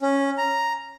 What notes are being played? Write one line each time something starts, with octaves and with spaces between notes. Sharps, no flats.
C#4
A#5